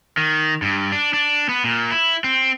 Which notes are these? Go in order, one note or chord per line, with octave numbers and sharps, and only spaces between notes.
D#3
G2
D4
D4
B3
A#2
E4
C4